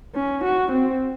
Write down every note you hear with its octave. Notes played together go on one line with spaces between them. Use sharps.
C#4
F#4
C4